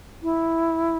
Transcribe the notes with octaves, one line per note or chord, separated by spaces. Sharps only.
E4